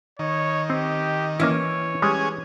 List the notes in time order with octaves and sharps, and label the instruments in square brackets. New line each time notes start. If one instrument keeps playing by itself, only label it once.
[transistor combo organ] D#3 [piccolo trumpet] C#5
[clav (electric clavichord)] C4 [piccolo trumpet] G4
[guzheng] E3 [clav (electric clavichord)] A#3 C#4 E4 [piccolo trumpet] C#5
[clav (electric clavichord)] G3 G#3 [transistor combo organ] C#4 G#4